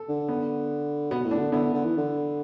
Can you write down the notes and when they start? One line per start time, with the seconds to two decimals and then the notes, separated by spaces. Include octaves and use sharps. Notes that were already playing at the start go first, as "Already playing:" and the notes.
Already playing: A4
0.09 D3
0.28 B3
1.11 B2 B3
1.25 A2
1.31 D4
1.38 D3
1.52 D3 B3 E4
1.73 D3
1.85 E3
1.97 D3